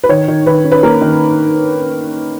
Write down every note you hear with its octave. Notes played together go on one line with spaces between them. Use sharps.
B4
D#3 C#5
D#3
D#3 B4
C#4
B4
A#3 A#4
D#3